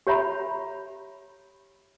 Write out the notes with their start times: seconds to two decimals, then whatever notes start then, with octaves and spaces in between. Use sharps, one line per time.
0.07 G4 C#5 E5 A#5 B5